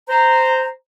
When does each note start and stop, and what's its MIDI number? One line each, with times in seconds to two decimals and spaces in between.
0.09 0.68 72
0.09 0.68 82